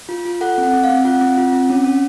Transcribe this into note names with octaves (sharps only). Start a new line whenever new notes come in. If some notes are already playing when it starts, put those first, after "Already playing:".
F4
F4
A4 F#5
C4
F#5
C4
F5
C4
F4 F#5
C4
F4
C4
C#4
C#4